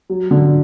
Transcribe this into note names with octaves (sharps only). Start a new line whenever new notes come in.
F#3
D3